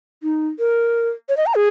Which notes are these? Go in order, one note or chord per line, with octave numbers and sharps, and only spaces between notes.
D#4
A#4
C#5
D#5
A#5
G#4